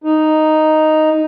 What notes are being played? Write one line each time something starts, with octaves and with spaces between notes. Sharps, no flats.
D#4